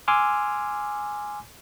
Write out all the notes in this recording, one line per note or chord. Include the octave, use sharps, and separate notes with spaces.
G#5 C6 D6 E6 F6